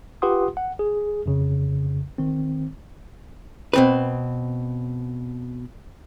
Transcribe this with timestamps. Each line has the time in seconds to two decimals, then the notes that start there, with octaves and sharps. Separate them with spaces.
0.22 F4 G4 B4 F#5 C6 D#6
0.57 F#5
0.79 G#4
1.26 F2 C#3
2.18 D#3 C4
3.73 B2 C4 B4